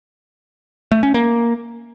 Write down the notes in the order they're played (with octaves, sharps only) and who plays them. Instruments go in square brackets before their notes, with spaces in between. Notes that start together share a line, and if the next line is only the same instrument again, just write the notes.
[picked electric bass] A3
C#4
A#3